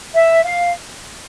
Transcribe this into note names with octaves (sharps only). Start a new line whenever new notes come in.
E5
F5